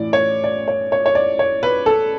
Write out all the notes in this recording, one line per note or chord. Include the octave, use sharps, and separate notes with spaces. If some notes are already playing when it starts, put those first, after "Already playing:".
Already playing: A2 E3 D5
C#5
D5
C#5
C#5
C#5
D5
C#5
B4
A4